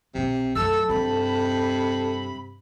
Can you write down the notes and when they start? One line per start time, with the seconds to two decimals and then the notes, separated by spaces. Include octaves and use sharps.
0.15 B1 C3 C4
0.55 F#2 A3 A4 A5 E6
0.89 G2 C3 B5